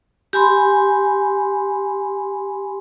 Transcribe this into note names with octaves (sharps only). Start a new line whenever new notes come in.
G4 G#5 B5 C6